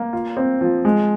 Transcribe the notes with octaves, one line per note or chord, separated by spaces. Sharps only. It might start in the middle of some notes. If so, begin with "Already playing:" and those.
Already playing: A#3
F4
C4
F3
G#3